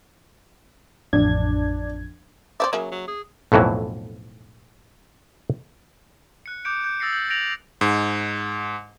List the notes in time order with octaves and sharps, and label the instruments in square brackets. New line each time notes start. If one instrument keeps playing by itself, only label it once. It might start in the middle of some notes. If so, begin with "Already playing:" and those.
[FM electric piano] A1 F2 G#6 [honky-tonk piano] D4
[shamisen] C4 C5 E5 [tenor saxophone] D5
[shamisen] C#3 A#3 E5 [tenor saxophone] F#3
[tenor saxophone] F#3
G#4
[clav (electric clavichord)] B1 F2 A2 E3 F#3
[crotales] F#6 C#7
D6 D#6 G6 C#7 D7
G6
D#6 E6 A6 A#6 C7 C#7
G6 F#7
G6 A6 A#6 D7 F7 F#7
[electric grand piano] G#2